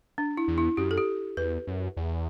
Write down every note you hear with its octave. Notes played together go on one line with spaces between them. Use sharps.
D4
E4
E2
E4
F#2 G4
A4
G4
E2 B4
F#2
E2